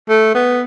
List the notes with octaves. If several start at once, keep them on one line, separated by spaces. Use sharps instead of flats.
A3
B3